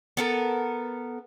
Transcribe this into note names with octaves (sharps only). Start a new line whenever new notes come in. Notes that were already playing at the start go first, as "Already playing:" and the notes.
B3 A4 A#4